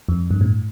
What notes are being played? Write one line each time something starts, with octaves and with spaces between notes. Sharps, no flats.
F2
G2
A2